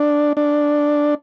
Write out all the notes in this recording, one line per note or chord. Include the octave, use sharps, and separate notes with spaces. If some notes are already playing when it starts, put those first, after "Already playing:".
Already playing: D4
D4